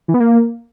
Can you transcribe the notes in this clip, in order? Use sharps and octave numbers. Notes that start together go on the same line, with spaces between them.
E3
B3
A#3